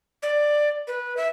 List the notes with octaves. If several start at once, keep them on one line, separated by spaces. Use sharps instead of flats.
D5
B4
E5